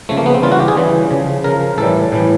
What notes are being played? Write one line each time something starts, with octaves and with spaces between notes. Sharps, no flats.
C#3 F3 A3
A#3
B3
C4
C#3 E3 G3 F4
F#4
G4
G#4
C#3 E3 G3
C#3 F3
C#3 F3 A#4
A2 E3 G3 A4
A2 E3 G3